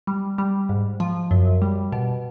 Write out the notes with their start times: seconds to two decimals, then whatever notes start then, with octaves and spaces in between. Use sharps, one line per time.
0.07 G3
0.38 G3
0.69 G#2
1.00 F3
1.31 F#2
1.62 G3
1.92 B2